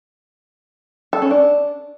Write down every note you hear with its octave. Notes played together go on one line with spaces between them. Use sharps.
A4
C#4
D4